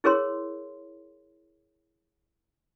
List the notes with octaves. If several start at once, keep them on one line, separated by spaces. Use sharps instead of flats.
E4 G#4 A#4 C#5 C6